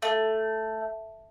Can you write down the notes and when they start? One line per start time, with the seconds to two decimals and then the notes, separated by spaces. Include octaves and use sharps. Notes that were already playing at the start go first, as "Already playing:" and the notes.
0.02 A3